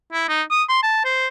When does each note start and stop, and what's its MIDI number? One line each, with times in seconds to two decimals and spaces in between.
0.13 0.27 64
0.29 0.42 63
0.51 0.63 87
0.69 0.79 84
0.83 1.01 81
1.05 1.27 72